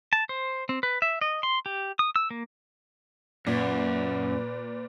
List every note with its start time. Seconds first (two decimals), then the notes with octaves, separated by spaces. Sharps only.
0.13 A5
0.29 C5
0.69 C4
0.83 B4
1.02 E5
1.21 D#5
1.43 C6
1.66 G4
1.99 D#6
2.16 E6
2.31 A#3
3.47 F#2 A#2 B4